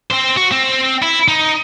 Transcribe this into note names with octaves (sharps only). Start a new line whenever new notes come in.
C4 C5
F#4
C4
E4
D#4